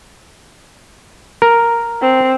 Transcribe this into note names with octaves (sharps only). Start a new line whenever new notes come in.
A#4
C4